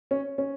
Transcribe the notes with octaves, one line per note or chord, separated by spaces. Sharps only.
C#4
C#4